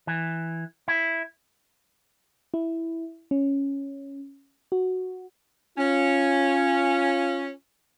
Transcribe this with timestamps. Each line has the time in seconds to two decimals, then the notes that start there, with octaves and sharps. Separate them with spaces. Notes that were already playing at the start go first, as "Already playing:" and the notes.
0.07 E3
0.88 E4
2.54 E4
3.31 C#4
4.72 F#4
5.78 C#4 F4